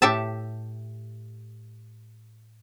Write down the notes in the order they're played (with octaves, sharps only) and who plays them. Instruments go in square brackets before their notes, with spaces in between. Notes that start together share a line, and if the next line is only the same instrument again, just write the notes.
[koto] A2 G4 A4 E5 A5